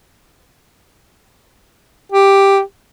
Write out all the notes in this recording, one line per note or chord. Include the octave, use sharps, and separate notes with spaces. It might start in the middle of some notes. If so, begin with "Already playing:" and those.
G4